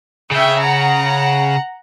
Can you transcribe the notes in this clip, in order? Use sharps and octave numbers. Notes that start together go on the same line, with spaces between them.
C#3 E5 G5
F#5 A#5